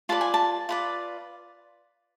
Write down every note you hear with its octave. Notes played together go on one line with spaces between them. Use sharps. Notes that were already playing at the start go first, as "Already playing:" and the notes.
F4 B4 D5 A5
G#5
A5
F4 B4 D5